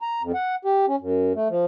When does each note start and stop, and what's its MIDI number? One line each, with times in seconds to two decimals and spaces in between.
0.01 0.22 82
0.22 0.32 41
0.35 0.55 78
0.65 0.86 67
0.88 0.96 61
1.00 1.33 42
1.35 1.48 57
1.50 1.65 53